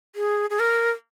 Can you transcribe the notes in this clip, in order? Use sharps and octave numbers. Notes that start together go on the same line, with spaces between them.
G#4
G#4
A#4